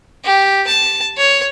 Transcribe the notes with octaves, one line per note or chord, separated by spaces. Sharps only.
G4
A5
C#5